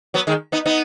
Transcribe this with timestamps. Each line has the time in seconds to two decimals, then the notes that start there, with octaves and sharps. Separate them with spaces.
0.14 F#3 B3
0.27 D#3 G#3
0.52 B3 D#4
0.66 B3 D#4